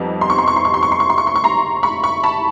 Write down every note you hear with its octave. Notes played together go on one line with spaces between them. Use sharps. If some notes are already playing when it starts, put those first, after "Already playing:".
Already playing: F2 G3 B3 D#4 A5
C6
C#6
C6
C#6
C6
C#6
C6
C#6
C6
C#6
C6
C#6
C6
C#6
A#5 C6
B5 C#6
B5 C#6
A5 B5